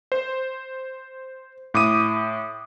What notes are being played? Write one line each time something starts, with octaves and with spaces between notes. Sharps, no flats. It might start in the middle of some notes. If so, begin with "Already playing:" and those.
C5
A2 D6 D#6 D#7